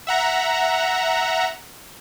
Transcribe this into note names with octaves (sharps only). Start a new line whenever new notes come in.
E5 F#5 A#5